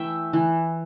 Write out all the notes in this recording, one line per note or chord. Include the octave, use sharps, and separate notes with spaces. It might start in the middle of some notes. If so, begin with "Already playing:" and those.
Already playing: E3 A3 E5 G5
E3